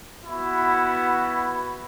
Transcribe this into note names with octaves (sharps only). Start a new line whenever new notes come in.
B3 E4 F#4